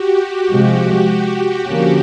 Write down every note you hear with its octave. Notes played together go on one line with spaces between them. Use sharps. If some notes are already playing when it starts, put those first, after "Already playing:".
Already playing: F#4 G4
C3 F3 G#3
D3 F3 A#3 C#4